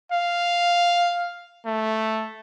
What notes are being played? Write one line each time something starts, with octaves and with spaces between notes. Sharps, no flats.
F5
A3